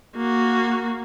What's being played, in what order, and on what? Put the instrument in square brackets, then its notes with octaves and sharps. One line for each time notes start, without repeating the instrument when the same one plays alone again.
[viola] A#3 F#4